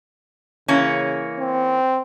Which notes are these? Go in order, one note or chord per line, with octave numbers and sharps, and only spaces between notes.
C#3 E3 A#3 C#4
C4